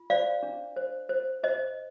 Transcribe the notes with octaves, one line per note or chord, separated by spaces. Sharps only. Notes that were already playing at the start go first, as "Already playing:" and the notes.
Already playing: F4
C5 D5 F5
D4
C5
C5
C5 D#5